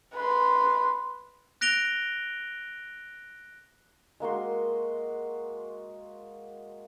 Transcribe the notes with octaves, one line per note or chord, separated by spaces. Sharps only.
B4 C6
F#6 A#6 D7 F7 G7
G#3 A#3 F#4 C6